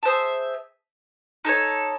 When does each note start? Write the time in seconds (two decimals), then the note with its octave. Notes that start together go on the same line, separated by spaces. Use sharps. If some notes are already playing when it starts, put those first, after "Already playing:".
0.03 G#4 C5 E5 A5
1.45 D#4 A4 C#5